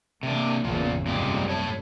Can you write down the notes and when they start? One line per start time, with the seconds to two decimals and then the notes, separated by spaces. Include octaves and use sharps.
0.23 C3 A#3 D4
0.64 G#1 E2 A#2 C#3 F3
1.06 C2 F#2 A#2 G#3 G4
1.49 A2 C#5 A5